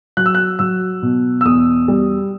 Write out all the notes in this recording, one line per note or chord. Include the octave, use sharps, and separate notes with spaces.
F#3 F#6
E6
F#6
F#3 E6
B2
E6
E2 D#6
G3